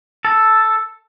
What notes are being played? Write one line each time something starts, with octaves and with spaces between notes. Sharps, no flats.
A4